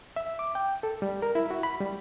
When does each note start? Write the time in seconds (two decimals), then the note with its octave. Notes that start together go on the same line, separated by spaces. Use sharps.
0.16 E5
0.39 D6
0.55 G5
0.83 A4
1.02 G3
1.22 A#4
1.35 E4
1.51 F#4
1.63 B5
1.81 G3